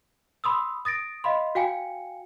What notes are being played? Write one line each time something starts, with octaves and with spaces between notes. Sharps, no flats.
B5 C6 D#6 E6
D#6 A6 A#6 D7
D#5 F5 B5 C6
F#4 F5 G5 G#5 C#7